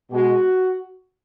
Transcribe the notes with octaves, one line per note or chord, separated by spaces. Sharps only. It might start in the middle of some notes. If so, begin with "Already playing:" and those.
B2 G#3 F#4